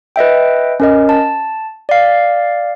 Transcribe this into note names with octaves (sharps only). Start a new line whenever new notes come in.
B4 D#5 E5 G5
C#4 A#4 D#5
A5
D5 F5